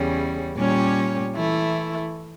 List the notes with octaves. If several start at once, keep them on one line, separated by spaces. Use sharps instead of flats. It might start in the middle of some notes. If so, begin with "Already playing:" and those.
Already playing: E2 C#3 G3 C#4
A#2 G3 C#4 G4 C#5
E3 A3 E4